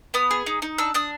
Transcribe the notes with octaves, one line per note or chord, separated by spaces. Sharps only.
B3 D#6
G#4
D#4
D#4
D4 E6
D4 D#6